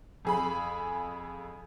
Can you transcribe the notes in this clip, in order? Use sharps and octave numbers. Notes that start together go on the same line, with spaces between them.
F2 G#4 B5